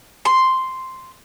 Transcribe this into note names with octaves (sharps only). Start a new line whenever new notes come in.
C6